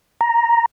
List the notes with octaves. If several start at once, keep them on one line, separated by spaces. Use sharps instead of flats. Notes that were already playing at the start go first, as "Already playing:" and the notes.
A#5